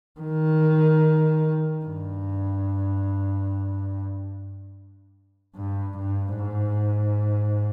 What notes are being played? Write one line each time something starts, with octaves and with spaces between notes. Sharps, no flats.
D#3
G2
G2
G2
G#2